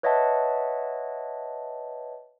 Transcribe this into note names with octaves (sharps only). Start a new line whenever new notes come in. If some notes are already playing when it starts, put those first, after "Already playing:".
B4 C#5 D#5 E5 F#5 A5